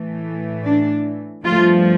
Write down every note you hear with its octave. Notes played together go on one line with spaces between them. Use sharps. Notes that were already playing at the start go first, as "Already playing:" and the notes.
Already playing: A2 E3 A3
D4
G2 F3 A3 F4